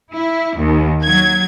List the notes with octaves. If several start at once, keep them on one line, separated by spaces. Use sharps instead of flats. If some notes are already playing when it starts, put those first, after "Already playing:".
E4
D#2
F#3 G#6